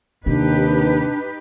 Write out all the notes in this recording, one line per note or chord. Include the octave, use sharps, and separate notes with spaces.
D#2 C3 D4 D#4 G4 B4